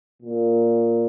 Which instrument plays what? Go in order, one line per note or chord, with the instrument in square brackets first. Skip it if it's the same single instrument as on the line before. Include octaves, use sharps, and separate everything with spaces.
[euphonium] A#2